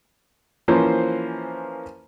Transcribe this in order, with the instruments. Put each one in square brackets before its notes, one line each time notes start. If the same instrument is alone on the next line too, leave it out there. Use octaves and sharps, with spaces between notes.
[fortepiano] E3 F3 A#3 C#4 C5